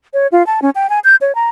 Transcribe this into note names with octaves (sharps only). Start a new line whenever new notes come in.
C#5
F4
A5
C#4
G5
G#5
G6
C#5
A#5